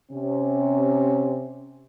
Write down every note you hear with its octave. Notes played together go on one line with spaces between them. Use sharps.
C3 C#4